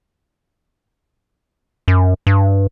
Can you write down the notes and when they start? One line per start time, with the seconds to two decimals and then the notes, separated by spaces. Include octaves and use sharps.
1.88 F#2
2.27 G2